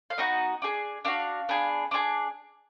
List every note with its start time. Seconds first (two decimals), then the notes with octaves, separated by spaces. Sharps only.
0.10 F5
0.18 B3 D#4 F#4 D#5
0.62 D4 G#4
1.05 D4 F#4 F5
1.49 B3 D4 G#4
1.91 D4 F4 G#4